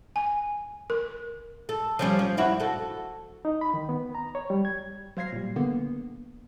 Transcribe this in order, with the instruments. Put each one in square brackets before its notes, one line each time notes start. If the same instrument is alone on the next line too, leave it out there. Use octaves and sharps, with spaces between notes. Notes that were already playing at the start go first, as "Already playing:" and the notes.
[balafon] G#5
A#4
[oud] A4
F3 G3 C#4
F3
G2 E4 F#4
F#4 A4
[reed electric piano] D#4
B5
D#3
B3
A#5
C#5
G3
G#6
[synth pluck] F#3 C5 F5 G#6 A#6 C7
A#2 G3
D3 A#3 B3